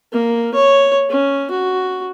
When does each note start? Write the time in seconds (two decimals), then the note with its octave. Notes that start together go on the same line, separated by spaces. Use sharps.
0.12 A#3
0.54 C#5
1.10 C#4
1.51 F#4